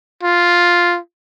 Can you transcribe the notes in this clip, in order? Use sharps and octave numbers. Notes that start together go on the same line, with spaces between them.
F4